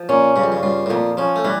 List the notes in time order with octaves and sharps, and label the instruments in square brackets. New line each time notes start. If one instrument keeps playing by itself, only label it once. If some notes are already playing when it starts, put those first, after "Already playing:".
Already playing: [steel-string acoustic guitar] F3
[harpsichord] A#2 [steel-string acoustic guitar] C#4
[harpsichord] G2 [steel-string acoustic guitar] C#3
[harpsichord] F2
G2
[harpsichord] G2 [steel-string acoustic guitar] F4
[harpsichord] A2
[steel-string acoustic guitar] F2 [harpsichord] A#2
[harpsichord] F3 [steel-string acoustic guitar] C#4
[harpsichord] A3
[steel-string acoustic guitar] E3 [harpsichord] G3